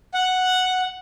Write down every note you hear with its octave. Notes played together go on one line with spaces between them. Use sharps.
F#5